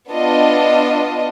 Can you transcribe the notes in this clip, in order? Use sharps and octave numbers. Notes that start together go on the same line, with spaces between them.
B3 D4 F4 D#5